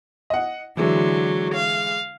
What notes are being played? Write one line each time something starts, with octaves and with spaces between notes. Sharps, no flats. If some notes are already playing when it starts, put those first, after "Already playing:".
D#5 F#5
D3 E3 F#3 G#3 E4
F5